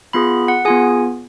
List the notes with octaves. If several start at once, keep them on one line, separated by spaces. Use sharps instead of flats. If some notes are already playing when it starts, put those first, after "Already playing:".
B3 F4 G#4 B5
F#5
B3 F4 G#4 G#5